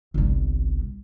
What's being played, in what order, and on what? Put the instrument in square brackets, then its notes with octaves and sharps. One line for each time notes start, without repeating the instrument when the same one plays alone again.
[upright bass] G1 C2